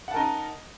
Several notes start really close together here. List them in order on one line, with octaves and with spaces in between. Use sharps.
F#5 A5 A#4 D#4